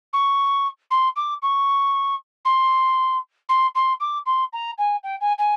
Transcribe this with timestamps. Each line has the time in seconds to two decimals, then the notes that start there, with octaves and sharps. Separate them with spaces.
0.13 C#6
0.91 C6
1.16 D6
1.42 C#6
2.45 C6
3.49 C6
3.75 C6
4.00 D6
4.26 C6
4.53 A#5
4.78 G#5
5.03 G5
5.21 G#5
5.38 G#5